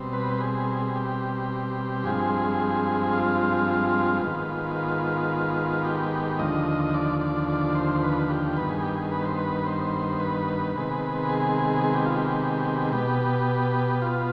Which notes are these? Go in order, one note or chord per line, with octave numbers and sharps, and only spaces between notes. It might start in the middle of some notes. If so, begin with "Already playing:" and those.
Already playing: B2 G3 C4
B4
G#4
G4
G2 F3 G#3 C4 G#4
F4
G#2 D#3 B3
F4
G4
D#2 D3 F3 D#5
D5
D5
D5
C5
B4
G4
G2 D#3 B3 B4
G#4
G4
G#4
B4
C5
B4
C5
B4
C3 D#3 G#3 B3
G#4
G#4
G4
F4
G4
B2 B3 G4
F4